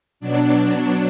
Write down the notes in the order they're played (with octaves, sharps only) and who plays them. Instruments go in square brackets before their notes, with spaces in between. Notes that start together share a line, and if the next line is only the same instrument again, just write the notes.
[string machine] B2 F#3 D4